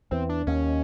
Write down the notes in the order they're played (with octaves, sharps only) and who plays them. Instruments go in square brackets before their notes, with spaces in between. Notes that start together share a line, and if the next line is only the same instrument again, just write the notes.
[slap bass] E2 E3 [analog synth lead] C4
[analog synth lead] D4
[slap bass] D#2 D#3 [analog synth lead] C#4